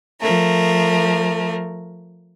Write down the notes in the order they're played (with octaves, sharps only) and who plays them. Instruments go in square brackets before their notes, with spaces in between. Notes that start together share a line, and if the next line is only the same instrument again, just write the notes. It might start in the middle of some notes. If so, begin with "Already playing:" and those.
[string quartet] F3 A3 A#4